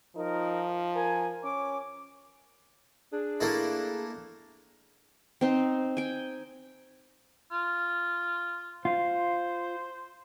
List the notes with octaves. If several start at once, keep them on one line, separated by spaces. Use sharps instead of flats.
F3 D#4 A#4
A#4 G#5
C#4 D6
D4 G#4
A3 A#3 E4
C4 D#4 C6
G5 G#5
F4
F4 C5